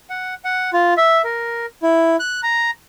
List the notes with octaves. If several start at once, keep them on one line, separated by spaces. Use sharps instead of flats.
F#5
F#5
F4
E5
A#4
E4
F#6
A#5